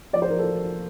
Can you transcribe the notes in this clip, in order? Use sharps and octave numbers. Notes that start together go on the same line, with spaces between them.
F3 D5
C5
F3 A#4
A4